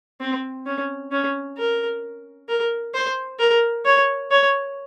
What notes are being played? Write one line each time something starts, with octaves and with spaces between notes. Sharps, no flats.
C4
C#4
C#4
A#4
A#4
C5
A#4
C#5
C#5